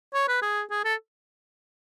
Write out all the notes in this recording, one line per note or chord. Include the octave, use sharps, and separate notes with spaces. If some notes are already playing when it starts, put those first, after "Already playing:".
C#5
B4
G#4
G#4
A4